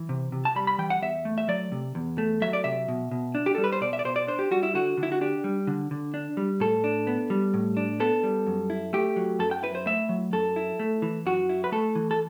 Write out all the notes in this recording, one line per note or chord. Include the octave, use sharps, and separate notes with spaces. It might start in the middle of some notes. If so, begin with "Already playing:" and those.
Already playing: E3
C3
C3
A5
G3 B5
B5
E3 G5
F#5
E2 E5
A3
E5
F#3 D5
C3
E2
A3
F#3 E5
D5
C3 E5
B2
B2
D4
G4
G3 A4
B4
C5
B2 D5
E5
D5
B2 C5
D5
D4 C5
G4
G3 F#4
E4
D3 F#4
D3
E4
F#4
D4 G4
G3
D3
D3
D4
G3
A2 A4
D4
B3
G3
A2
D4
B3 A4
G3
F#2
E4
A3 G4
F#3
F#2 A4
G5
E4 B4
C5
A3 E5
F#3
F#2 A4
E4
A3
E3
F#2 F#4
E4
B4
A3 A4
E3
A4